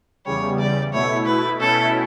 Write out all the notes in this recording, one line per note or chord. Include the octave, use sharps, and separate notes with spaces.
E2 C#3 G3 C#5
D5
B2 A3 E4 C#5
B4
B2 A3 C#4 E4 A4